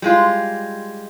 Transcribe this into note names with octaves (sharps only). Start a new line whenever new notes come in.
G3 G#3 F4